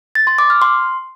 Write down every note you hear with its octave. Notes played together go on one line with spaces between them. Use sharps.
A6
C6
D6
F6
C6